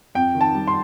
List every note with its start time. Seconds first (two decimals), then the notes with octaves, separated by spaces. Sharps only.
0.15 F2 G5
0.35 D#3
0.41 A5
0.54 G3
0.68 C6